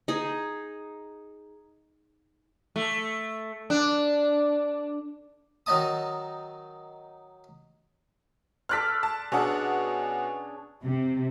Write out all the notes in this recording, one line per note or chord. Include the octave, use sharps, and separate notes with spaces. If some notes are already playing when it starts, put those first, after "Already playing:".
D#4 G#4
A3
D4
D#3 F#3 D#4 D#5 A5 D#6
A4 D5 C6 F6 F#6 B6
A5
B2 C#4 D4 G#4 F#5
C3